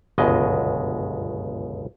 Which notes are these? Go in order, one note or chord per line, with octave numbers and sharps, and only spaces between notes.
G1 C#2 F#2 B2 G#3 D#5